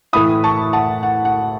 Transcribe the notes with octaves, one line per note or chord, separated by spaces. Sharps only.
A2 E3 A3 E4 B5 D#6
A5 C#6
F#5 A5
F#5
F#5